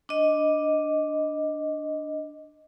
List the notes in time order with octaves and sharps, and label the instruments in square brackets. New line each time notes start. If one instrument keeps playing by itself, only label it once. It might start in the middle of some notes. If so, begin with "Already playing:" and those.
[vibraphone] D4 D#5